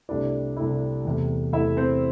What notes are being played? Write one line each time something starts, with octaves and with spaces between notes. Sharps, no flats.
C2 C3 A3 D4 E4 D5
C2 C3 A3 E4
E2 C3 A3
E2 C3 A3 E4 E5
C4 C5